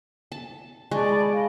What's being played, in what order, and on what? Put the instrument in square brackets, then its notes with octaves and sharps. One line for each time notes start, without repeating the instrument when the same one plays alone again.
[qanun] A5
[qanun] G#3 [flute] D5 [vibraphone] A5 C#6
[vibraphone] B5
[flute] D#5 [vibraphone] F5